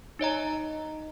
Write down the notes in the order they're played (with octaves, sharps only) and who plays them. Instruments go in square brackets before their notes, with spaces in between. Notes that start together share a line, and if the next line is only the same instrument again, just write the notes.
[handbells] D#4 C#5 D#5 A#5